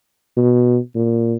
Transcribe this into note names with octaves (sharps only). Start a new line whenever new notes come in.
B2
A#2